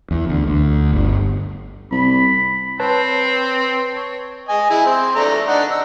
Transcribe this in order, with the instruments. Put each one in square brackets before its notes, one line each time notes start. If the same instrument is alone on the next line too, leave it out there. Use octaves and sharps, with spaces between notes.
[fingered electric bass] E2
D2
D2
G1
[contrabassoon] C2 [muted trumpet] B5
[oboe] C4 [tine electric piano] B4 C#5 A5
[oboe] C#5
[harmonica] D#5 G#5
E4 G#4
C4
A3 D4 A#5
D4 D#4 F#5
E6